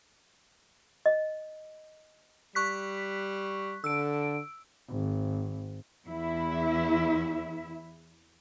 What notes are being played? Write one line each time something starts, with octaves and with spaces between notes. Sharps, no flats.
D#5
G3 C#6 F#6 B6
D3 A4 E6 D7
G#1
E2 E4 E5